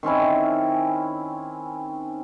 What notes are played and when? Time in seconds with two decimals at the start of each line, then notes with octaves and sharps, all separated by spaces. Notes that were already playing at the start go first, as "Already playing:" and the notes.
0.03 D#3 C4 C#4 E4